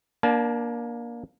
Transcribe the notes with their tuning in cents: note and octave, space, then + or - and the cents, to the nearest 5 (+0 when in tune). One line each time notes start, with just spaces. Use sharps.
A#3 +20 D4 +0 A5 -35